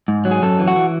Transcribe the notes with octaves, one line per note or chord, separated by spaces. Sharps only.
G#2
F#3
G#4
F#2 A4
E3
F#4
E3